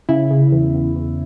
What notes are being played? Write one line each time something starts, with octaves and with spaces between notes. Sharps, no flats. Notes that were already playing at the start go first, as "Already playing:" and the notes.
C#3 E4
C#3
E2
E2
E2